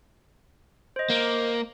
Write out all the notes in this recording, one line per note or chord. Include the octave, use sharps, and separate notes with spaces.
C5 D#5
A#3